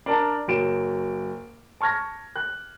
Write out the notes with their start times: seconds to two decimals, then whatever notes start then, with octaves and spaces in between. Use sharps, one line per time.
0.06 D4 A#4 D5 A5 A#5
0.48 F#1 F#3 D7 E7
1.81 A5 C#6 F6 G#6 A#6
2.36 F#6